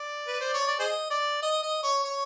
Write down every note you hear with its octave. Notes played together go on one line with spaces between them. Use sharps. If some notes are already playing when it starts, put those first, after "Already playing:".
Already playing: D5
B4
C5
C#5
D5
G#4 C5 D#5
D5
D#5
D#5
C#5
C#5